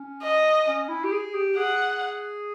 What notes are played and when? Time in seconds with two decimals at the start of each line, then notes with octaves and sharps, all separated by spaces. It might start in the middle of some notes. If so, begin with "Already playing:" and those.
Already playing: C#4
0.22 D#5
0.67 C#4
0.89 E4
1.04 G4
1.12 G#4
1.34 G4
1.57 G#4 F#5